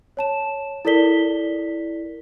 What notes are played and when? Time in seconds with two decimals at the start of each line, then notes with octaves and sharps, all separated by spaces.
0.17 C#5 A5 E7
0.85 E4 A4 A#4 D5 B6 G7